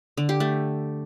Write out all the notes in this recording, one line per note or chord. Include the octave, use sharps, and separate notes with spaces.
D3
G4
A3